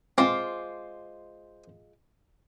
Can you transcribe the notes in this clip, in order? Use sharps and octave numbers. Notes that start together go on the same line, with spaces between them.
G#3 C4 F4 C5 C6 D6